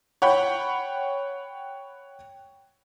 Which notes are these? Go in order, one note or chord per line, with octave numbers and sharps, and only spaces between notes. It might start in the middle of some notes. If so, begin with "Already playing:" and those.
C#5 F#5 G5 B5